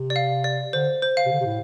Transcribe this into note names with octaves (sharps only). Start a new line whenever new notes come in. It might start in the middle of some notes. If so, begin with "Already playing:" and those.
Already playing: C3
D5
F5
D5
D3 C5
C5
F5
C3
D3
C3
A2